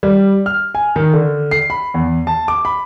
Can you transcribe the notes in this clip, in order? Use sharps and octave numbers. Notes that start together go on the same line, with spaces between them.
G3
F6
G#5
D#3
D3
C7
B5
E2
A5
D6
B5